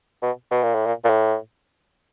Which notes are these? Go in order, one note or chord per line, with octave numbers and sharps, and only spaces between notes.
B2
B2
A#2
A2
A#2
A#2
A2